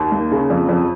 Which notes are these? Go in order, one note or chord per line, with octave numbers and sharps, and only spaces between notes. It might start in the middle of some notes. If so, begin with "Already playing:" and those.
Already playing: D#2
A#3
C#3
F2
F2